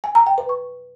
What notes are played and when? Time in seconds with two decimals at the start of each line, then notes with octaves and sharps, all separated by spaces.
0.04 G#5
0.15 A#5
0.27 G5
0.38 B4
0.49 C#6